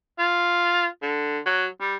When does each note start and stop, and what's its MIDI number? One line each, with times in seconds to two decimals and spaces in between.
0.19 0.87 65
1.02 1.39 50
1.46 1.67 54
1.81 1.96 55